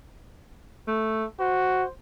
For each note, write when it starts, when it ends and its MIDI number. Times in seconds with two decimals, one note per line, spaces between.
0.87 1.24 57
1.39 1.84 66
1.39 1.90 72